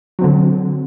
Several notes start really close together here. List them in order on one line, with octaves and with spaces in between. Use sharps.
F#3 C4 D3